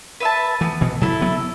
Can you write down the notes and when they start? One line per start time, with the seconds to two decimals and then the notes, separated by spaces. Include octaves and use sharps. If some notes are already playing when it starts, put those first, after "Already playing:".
0.20 B4 E5 A5
0.61 E3 A3 B3
0.81 B2 E3
1.01 C#3 F#3 E4 A4
1.21 F#3 B3